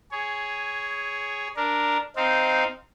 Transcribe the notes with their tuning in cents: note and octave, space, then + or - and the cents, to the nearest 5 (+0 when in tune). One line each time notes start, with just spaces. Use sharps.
G#4 +0 C#5 +10
D4 +0 A#4 +0
C4 -10 D#4 +0 F5 +0